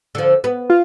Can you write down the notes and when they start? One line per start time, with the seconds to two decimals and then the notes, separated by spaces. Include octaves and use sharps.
0.15 D3 F3
0.44 B3
0.70 F4